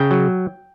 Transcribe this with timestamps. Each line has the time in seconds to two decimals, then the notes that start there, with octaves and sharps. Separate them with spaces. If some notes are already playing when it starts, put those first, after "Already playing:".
Already playing: C#3 G5
0.11 F#3